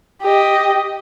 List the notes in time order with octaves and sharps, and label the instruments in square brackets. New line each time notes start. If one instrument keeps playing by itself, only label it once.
[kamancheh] G4 D#5